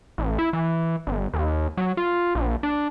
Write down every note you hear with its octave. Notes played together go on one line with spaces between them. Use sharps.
A1
E4
E3
G1
D#2
F#3
F4
A#1
D4